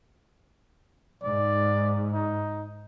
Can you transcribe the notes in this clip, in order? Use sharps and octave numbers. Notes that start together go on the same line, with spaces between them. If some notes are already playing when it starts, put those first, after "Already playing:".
G#2 D5
D#4